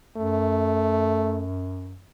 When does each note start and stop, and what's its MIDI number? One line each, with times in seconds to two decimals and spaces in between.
0.17 2.02 42
0.17 1.44 57